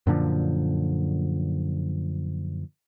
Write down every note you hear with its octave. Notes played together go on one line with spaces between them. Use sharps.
F#2 A#2 D3 F3